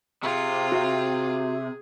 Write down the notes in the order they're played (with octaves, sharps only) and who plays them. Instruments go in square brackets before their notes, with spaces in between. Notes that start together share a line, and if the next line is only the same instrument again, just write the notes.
[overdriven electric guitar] C3 [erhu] F4 [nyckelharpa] G#4
[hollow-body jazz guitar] F#4 E5